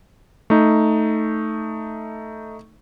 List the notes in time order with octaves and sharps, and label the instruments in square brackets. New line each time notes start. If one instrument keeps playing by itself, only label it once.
[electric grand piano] A3 D#4